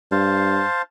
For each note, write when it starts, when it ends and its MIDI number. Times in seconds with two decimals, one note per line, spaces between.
0.12 0.63 43
0.12 0.82 72
0.12 0.82 77
0.12 0.82 81